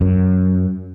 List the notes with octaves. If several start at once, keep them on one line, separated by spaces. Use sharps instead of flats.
F#2